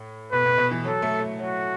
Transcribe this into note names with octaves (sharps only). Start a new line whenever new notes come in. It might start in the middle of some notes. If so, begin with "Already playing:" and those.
Already playing: A2
B2 B4
B2
B2
E3
F#3 A4
A3
A3
F#3 F#4